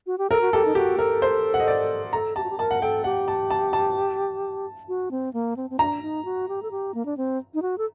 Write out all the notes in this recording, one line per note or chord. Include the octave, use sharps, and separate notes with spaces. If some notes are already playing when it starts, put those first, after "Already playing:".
F#4
G4
A4 A#4
F#4
G4 A4
D#4
F#4 G4
A4 A#4
C5
F#5
D#5
D5
A4 A#5
G4 A5
F#4
G4
A#4 A5
F#5
A4 G5
G4 F#5
A5
A5
A5
F#4
C4
A#3
C4
C4
D4 A#5
D#4
F#4
G4
A4
G4
A#3
D4
C4
D#4
F#4
A4